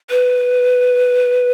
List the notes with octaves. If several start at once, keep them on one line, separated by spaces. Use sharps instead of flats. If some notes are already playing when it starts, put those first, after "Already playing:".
B4